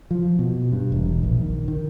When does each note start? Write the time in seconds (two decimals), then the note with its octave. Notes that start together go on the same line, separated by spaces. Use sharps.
0.11 F3
0.39 B2
0.72 G2
0.92 E1
1.23 A#1
1.41 D#3
1.68 D#3